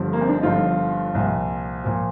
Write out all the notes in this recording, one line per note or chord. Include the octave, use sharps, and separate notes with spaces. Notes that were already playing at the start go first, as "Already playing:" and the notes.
Already playing: G1 G2 D3 F3
A#3
C4
D4
D#4
G1 G2 D3 F3 F4
C2 A#2 F3
A#2 F3